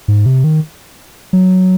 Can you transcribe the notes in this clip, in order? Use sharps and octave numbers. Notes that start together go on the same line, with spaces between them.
G#2
C3
D#3
F#3